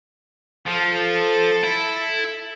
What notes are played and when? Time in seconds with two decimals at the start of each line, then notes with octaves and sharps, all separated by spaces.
0.68 F3 A4
1.64 E4